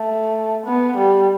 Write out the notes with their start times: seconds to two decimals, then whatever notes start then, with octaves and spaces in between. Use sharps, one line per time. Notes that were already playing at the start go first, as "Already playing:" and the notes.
Already playing: A3
0.66 B3
0.97 G3